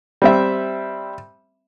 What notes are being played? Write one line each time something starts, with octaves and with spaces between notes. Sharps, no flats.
G3 C4 E5